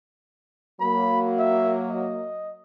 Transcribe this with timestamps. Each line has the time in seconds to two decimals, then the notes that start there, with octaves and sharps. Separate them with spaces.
0.80 F#3 A#3 B5
1.39 E5
1.89 D#5